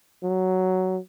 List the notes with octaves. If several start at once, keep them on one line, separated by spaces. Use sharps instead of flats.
F#3